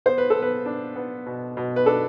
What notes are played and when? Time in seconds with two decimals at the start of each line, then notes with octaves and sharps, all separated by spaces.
0.06 B3 C5
0.18 B4
0.30 A4
0.36 B3
0.42 B4
0.66 D4
0.96 B3
1.26 B2
1.57 B2
1.76 B4
1.86 D4 A4